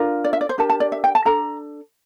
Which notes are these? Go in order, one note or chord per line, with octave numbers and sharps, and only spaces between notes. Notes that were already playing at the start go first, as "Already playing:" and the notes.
Already playing: D4 F4 A#4
D5
E5
D5
C5
D4 G4 A#4 A5
A5
D5
E5
G5
A5
D4 A4 A#5